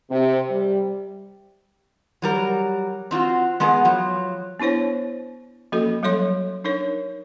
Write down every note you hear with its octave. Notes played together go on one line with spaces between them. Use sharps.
C3
G3
F#3 G3 A#4
C4 D#4 F4 F#4
G#3 B3 G#4 A#4 F#5
F3 F#3
B3 D4 E4 C5 C#5
F3 A#3 C#4 F#4 A4
F#3 G3 A4 C#5 C6
D4 D#4 A#4 C#5